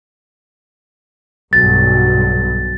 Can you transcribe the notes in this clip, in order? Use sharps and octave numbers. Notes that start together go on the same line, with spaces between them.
B1 G2 A6